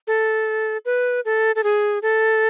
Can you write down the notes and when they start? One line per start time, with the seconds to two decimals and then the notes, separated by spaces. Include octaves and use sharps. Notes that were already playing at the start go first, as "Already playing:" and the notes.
0.07 A4
0.85 B4
1.25 A4
1.56 A4
1.64 G#4
2.02 A4